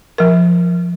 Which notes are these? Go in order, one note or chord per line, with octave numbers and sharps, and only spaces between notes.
F3 A#4